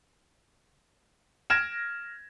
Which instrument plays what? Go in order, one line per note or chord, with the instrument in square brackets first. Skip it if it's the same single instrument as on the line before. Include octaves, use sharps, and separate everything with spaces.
[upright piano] F6 G#6 A#6 D7 E7